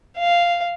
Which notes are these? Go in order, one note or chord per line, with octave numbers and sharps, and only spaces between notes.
F5